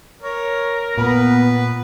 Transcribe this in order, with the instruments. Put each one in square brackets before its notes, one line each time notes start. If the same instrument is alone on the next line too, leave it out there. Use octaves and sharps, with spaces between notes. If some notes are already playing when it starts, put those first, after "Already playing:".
[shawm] A#4 [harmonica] C#5
[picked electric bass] A#2 [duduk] B3 [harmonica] B4